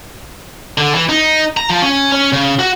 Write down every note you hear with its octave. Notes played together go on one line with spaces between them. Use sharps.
D3
E3
D#4
A#5
F3
C#4
C#4
C#3
F#4